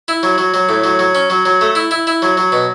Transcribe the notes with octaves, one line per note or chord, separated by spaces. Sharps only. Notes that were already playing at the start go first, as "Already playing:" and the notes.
E4
F#3
F#3
F#3
A2
F#3
F#3
C#4
F#3
F#3
A3
E4
E4
E4
F#3
F#3
B2